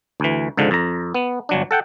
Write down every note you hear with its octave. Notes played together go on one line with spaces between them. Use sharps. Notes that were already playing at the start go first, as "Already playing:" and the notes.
D2 E3
C#2 G#2 D3 F3
F2 A#5
B3
G1 F#3 D4
A4 F#5 G5